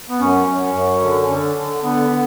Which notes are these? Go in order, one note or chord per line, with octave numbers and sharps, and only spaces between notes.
B3
F#2 C#4
F#2
F#2
D3
D3
D3
D3 B3
D3